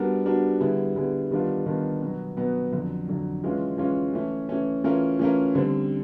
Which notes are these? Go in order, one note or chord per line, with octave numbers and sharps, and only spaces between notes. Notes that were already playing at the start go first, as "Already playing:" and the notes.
Already playing: G3 B3 D4 F#4 A#4
G3 B3 D4 F#4 A#4
D3 G3 B3 E4 G#4
D3 G3 B3 E4 G#4
D#3 G3 B3 D4 F4
D#3 G3 B3 D4 F4
B2 F#3 B3
B2 F#3 B3
F2 D3 F#3
F2 D3 F#3
E3 G#3 C#4 F4
E3 G#3 C#4 F4
E3 A3 C#4
E3 A3 C#4
E3 A3 C#4 F4 A#4
E3 A3 C#4 F4 A#4
D3 G3 C4